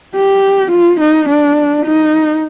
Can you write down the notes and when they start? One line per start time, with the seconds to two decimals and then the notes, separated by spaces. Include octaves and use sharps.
0.16 G4
0.72 F4
1.00 D#4
1.29 D4
1.86 D#4